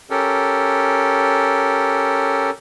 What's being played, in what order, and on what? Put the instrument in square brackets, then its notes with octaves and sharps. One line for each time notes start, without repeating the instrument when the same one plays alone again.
[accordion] C#4 G4 A4 A#4